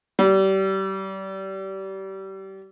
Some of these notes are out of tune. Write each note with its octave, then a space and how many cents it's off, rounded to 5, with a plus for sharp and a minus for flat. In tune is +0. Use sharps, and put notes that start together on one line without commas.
G3 -30